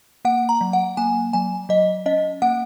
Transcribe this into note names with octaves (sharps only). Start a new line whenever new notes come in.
A#3 F#5
A#5
F#3
F#5
A#3 G#5
F#3 G#5
F#3 D#5
C#4 D#5
A#3 F#5